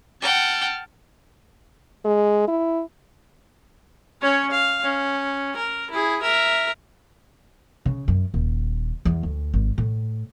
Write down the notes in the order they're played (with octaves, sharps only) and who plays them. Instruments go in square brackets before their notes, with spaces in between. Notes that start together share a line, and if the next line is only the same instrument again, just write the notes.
[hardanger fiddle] F#5 G5 [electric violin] A5 F6
[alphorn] G#3
E4
[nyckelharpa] C#4 C#5
F5
C#4
A#4
E4 G#4
A#4 E5
[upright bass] C#3
F#2
D#1
E2
D2
G#1
A2